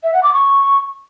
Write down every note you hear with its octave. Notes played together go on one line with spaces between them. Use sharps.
E5
F#5
D6
C#6